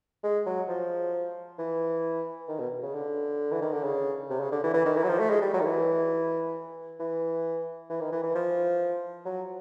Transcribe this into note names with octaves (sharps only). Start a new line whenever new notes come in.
G#3
F#3
F3
E3
D#3
B2
C#3
D3
E3
D#3
D3
C#3
C3
C#3
D3
E3
E3
D#3
E3
F#3
F3
A3
G#3
G3
F#3
D#3
E3
E3
E3
D#3
E3
E3
F3
F#3